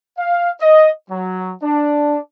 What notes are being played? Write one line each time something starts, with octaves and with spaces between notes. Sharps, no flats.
F5
D#5
F#3
D4